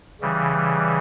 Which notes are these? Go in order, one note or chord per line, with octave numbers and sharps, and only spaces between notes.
C#3 E3 G3